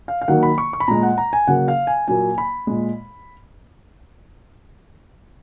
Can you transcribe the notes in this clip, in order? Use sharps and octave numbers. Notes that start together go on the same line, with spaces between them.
F5
F5
D#3 F#3 A#3 F#5
B5
C#6
C#6
B5
A#2 G#3 A#5
F#5
A#5
G#5
C#3 F#3 A#3 F#5
F5
G#5
A#2 F#3 A#3 G#5
B5
A#2 G#3